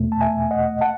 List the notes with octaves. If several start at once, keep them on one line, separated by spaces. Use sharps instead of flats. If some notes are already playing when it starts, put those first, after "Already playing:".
Already playing: E2 B2 A3
A5
E5 G#5
D#5 F#5
F#5 A5